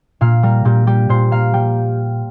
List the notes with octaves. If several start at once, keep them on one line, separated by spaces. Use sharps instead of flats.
A#2 F5
G3 A#4
A#2 G4
G3 G4
A#2 C5
A#3 F5
G3 G5